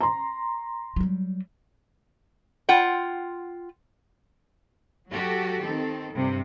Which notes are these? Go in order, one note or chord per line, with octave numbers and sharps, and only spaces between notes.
A#5 C6
F#3 G3
F4 F#5 G5
F#3 F#4 G4 A4
D#3 C4 A4
G2 C3